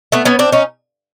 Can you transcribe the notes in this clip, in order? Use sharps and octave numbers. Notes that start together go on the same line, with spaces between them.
A3 B3
B3 C#4
C4 D4
C#4 D#4